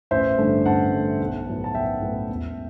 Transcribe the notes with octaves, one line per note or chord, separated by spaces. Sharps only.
A1 C5 E5
G2 D3 A3
A1 F#5 A5
G2 D3 A3
B1
A2 F#3 B3
A5
B1 E5 G5
A2 F#3 B3
E1